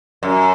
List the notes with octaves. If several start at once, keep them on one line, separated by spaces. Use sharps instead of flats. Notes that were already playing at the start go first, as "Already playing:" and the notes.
F#2